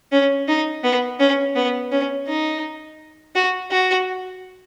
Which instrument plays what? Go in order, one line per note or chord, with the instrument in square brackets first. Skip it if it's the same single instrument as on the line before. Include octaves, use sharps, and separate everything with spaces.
[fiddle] C#4
D#4
B3
C#4
B3
C#4
D#4
F#4
F#4